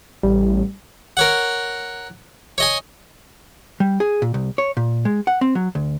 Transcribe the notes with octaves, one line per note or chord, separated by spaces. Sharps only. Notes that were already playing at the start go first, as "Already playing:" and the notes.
A1 G3
A#4 C#5 F#5
C#5 D#5 G#5
G3
G#4
A#2
C2
C#5
A#2
G#3
F#5
C4
F#3
D2